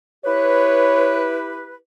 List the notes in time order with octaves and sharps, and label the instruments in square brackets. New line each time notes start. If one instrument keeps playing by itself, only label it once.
[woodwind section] E4 G4 B4 [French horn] C#5